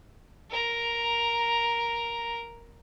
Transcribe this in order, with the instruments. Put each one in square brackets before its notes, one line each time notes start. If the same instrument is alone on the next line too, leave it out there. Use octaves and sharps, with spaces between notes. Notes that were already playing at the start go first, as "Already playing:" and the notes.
[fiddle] A#4 A#5